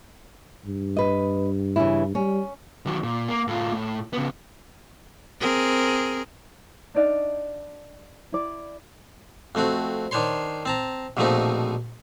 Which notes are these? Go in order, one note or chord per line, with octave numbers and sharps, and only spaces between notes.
G2
B4 D#5
C#3 E3 E4
G3 C#4
D#3 F#3
A#2
A#3
A2 F4
A2
C#3 B3
C4 G#4 A#4
D4 D#4 D5 F5
E4 D5
F2 A3 C4 F#4
D#3 D4 C5 C#5 C6
C4 A5 A#5
A#1 B2 F3 A3 C4 D#4